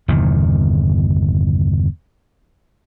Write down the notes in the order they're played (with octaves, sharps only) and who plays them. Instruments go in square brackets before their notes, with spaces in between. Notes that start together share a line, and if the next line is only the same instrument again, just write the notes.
[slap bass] G1 E2 C3 D#3